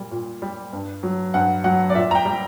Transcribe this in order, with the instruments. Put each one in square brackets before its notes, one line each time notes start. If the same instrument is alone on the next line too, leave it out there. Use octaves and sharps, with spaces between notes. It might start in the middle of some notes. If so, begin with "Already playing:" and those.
Already playing: [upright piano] A#2 G3
A#2
G3
G2
F#3
G2 F#5
F#3 F#5
D5
A#2 E5
A#5
G5
G3